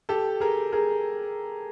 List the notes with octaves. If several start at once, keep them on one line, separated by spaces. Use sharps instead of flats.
G4 A4
G#4 A#4
G#4 A#4